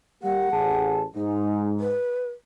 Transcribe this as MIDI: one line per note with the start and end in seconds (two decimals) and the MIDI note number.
0.23 0.48 55
0.23 0.48 58
0.23 0.48 67
0.23 0.91 78
0.51 1.04 33
0.51 1.04 68
0.51 1.04 81
1.15 1.94 44
1.15 1.69 63
1.80 2.28 71